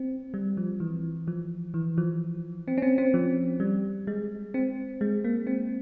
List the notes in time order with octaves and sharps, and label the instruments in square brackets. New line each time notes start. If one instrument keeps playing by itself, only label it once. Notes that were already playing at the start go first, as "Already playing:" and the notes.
Already playing: [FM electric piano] C4
G3
F3
E3
F3
E3
F3
C4
C#4
C4
C4
F3
G3
G#3
C4
G#3
A#3
C4